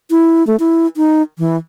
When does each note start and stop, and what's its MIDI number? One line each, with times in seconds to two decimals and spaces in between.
0.11 0.46 64
0.47 0.56 57
0.60 0.87 64
0.97 1.22 63
1.39 1.57 52